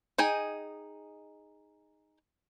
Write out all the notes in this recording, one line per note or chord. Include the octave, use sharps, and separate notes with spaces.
D#4 G#4 D#5 G5 G#5